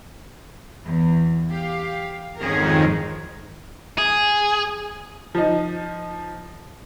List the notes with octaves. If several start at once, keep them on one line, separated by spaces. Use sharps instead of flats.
E2
G4 F5
F2 G#2 D#3 C#4 G#4 A#4
G#4
F3 D#4